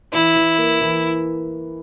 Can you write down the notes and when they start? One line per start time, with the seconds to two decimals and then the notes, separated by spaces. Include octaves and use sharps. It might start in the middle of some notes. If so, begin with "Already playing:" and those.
0.13 E3 E4
0.36 E3
0.58 A#3
0.81 E3